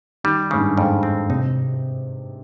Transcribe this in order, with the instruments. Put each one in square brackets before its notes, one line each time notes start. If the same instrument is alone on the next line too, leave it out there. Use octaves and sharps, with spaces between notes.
[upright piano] D#3 [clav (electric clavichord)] G3
[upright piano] G#2 [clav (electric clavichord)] C#3
[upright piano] G2
[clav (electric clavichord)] F2 [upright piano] G#2
[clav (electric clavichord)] C4
[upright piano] C3 [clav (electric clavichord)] D#4